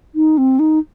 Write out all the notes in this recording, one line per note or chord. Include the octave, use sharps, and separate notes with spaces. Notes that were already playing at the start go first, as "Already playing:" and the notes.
D#4
C4
D#4